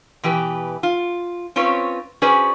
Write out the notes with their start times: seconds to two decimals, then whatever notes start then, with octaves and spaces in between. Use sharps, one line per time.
0.23 B2 E3 G4 B4
0.83 F4
1.56 C4 C#4 F4 B4 C#5
2.22 C#4 F#4 G#4 B4 C5 D5